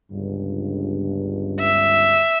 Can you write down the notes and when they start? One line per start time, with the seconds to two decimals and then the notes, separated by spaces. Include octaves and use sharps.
0.11 G1 C#2 G2
1.60 E5